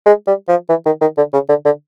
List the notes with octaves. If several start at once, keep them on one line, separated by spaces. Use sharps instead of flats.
G#3
G3
F3
E3
D#3
D#3
D3
C#3
D3
D3